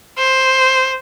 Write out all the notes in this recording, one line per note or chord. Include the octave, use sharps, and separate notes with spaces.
C5